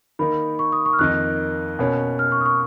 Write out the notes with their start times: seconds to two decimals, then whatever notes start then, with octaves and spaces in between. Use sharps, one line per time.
0.19 D#3 A#3 D#4 B5
0.59 C#6
0.72 D#6
0.86 C#6
0.93 F6
0.99 F2 D#3 A#3 D#4 F#6
1.79 B2 A#3 C#4
2.19 F6
2.32 C#6
2.41 D#6
2.46 C#6